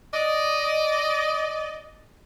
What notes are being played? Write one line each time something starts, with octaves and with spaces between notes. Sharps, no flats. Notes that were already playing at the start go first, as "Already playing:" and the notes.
D5 D#5